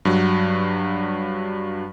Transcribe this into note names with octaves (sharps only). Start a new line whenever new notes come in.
G2 F#3